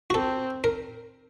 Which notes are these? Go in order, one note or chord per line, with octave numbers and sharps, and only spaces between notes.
F#4
C4 A4
A#4